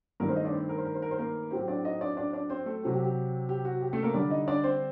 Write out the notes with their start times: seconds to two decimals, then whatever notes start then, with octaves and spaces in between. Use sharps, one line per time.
0.20 G2 D#3 A3 A#3 A#4
0.28 C4 C5
0.36 D#4 D#5
0.45 D4 D5
0.52 C4 C5
0.69 A#4
0.78 C5
0.85 A#4
0.94 C5
1.02 A#4
1.11 C5
1.18 A#3 A#4
1.51 A2 F#3 C4 G4
1.68 D4 D5
1.84 D#4 D#5
2.01 D4 D5
2.17 D4 D5
2.33 D4 D5
2.50 C4 C5
2.66 A3 A4
2.83 C3 F#3 C4 G4
2.94 G4
3.04 G4
3.49 G4
3.65 F#4
3.81 G4
3.93 A3 A4
4.03 A#3 A#4
4.14 D3 G3 D4 D5
4.30 D#4 D#5
4.48 D4 D5
4.64 C4 C5